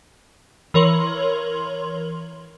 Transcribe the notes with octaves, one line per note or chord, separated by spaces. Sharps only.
E3 A#4 C#5 C6 F#7